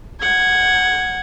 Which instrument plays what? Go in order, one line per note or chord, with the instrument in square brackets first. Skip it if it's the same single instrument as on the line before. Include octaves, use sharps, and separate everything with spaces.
[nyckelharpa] F#5 [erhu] G#6